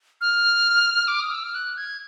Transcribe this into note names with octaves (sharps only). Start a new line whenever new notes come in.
F6
D6
D#6
E6
F6
F#6
G#6